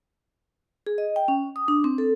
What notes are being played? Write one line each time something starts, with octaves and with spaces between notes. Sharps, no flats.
G#4
D#5
G5
C#4
D#6
D4
C4
A4